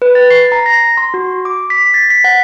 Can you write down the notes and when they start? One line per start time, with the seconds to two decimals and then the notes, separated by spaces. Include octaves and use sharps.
0.02 B4
0.15 A6
0.30 C7
0.52 A#5
0.66 A#6
0.97 C6
1.14 F#4
1.45 D6
1.70 B6
1.94 A6
2.10 B6
2.24 F#5